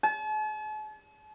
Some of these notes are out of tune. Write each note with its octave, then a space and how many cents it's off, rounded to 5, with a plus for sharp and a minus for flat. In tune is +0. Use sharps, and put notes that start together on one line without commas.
A5 -45